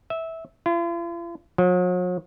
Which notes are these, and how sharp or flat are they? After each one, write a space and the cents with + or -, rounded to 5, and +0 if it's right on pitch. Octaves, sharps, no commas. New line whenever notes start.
E5 -15
F4 -45
F#3 -45